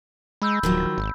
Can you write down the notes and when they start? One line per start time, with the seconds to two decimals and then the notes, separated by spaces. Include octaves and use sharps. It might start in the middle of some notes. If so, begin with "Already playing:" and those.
0.42 G#3 B5 E6 G6
0.63 D1 D#3 F3 F#3
0.98 G#1